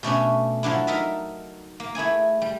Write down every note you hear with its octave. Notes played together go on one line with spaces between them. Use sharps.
B2 A3 C#4 D4
F3 F#3 D4 E4
D#4 A4 A#4 E5 A5
A#3
A3 E4 G#4 G#5
G3